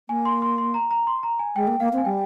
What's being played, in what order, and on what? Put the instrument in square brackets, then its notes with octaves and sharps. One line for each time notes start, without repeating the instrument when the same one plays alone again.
[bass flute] A#3 [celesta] G#5
[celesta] C6
C6
C6
A#5
A#5
C6
A#5
G#5
[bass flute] G#3 [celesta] G5
[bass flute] A#3
[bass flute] A#3 [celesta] F5
[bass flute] C4
[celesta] G#5
[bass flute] G3 [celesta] G5